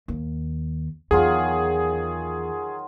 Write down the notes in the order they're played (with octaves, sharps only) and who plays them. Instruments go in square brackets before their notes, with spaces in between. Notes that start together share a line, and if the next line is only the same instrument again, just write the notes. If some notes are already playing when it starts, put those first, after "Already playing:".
[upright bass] D#2
[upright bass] E2 [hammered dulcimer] D#3 F#3 F4 [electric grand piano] G#4